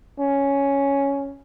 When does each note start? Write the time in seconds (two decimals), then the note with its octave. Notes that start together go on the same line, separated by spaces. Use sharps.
0.20 C#4